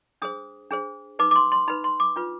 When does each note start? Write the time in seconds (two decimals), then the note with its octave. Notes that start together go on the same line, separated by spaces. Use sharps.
0.22 D4 G#4 C5 D#6
0.70 D4 G#4 C5
1.19 D#4 B4 D6
1.31 D6
1.36 C6
1.52 C6
1.68 D#4 B4 B5
1.84 C6
2.00 D6
2.16 D4 F4 B4